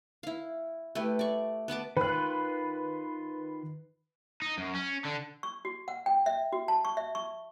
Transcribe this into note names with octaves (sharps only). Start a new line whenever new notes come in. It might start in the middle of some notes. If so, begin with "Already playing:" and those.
E4 F5
A3 E4 G4 B4
D5 C#6
B3 B4 A5 D6
D#3 F4 B4 F#6
D#4
F#2
C#4
D3
C#6
F#4
F#5
G5
E5
F#4
A5
C#6
E5
C#6